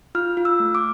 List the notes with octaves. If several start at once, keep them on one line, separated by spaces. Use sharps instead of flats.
F4 F6
F4
E6
A3
D6